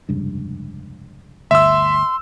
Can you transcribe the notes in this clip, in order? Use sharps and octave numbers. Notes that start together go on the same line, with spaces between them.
F1 C#2 G2
G1 D2 E5 C6 E6